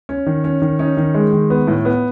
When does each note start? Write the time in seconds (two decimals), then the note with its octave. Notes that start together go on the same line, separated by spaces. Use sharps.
0.09 C#4
0.26 D#3
0.44 C#4
0.62 D#3
0.79 C#4 D#4
0.97 D#3
1.15 G#3
1.33 D#3
1.50 B3
1.67 A2
1.85 B3